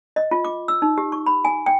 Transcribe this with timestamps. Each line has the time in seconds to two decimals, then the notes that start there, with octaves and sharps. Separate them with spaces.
0.16 D#5
0.31 F4
0.45 D6
0.68 E6
0.82 D#4
0.98 G4
1.12 C#6
1.26 B5
1.45 G#5
1.66 G5